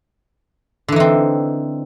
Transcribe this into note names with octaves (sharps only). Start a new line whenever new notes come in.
D3 E3 C4 D#4